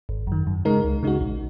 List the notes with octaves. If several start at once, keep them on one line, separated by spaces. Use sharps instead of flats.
G#1
F#2 D#3
F#2
C#3 G#3 D#4 A#4
C#2
C#3 G#3 D#4 F#4
A#1